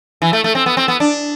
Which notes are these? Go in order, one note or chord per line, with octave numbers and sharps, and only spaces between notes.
E3
A3
A3
C4
B3
C4
B3
D4